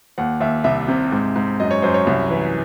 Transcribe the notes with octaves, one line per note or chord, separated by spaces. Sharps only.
D#2 F#5
D#2 E5
C2 E5
C3
G#2
G#2
F#2 D#5
C#5
F#2 C5
C#5
C2
E3